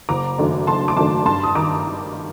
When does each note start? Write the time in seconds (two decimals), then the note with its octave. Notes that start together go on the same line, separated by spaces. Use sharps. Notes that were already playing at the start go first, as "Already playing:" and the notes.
0.09 F#1 A#5 D6
0.38 F#2 D#3 A3 D4
0.67 F#1 A5 C6
0.88 D6
0.96 F#2 D#3 A3 D4 A5 C6
1.25 G2 A5 C6
1.43 D#6
1.55 D#3 A#5 D6